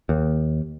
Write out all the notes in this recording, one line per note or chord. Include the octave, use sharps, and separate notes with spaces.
D#2